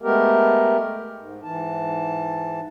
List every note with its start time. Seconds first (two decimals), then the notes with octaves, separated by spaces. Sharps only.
0.02 G#3 A3 B3 G4 A#4
1.19 G#2
1.44 G#2 E3 A5